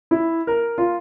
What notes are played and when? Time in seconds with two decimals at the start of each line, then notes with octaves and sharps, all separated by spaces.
0.11 E4
0.47 A#4
0.78 F4